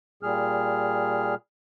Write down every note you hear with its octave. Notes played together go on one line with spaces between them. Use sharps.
A#2 G3 G#4 F6